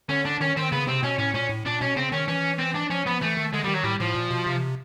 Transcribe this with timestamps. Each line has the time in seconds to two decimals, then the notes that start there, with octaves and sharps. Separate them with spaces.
0.09 D3 C#4
0.25 D4
0.41 D#3 C#4
0.56 D#3 C4
0.72 C#3 B3
0.87 C3 C4
1.03 B2 C#4
1.18 A2 C#4
1.34 A#2 C#4
1.49 A2
1.65 A#2 D4
1.81 B2 C#4
1.96 C#3 C4
2.12 D#3 C#4
2.28 E3 C#4
2.59 C4
2.75 D4
2.90 F3 C#4
3.06 F3 B3
3.21 E3 A3
3.37 D#3
3.53 D3 G#3
3.64 D#3 G3
3.74 F#3
3.83 A2 G3
4.00 A2 F3
4.15 A#2
4.31 B2
4.46 C3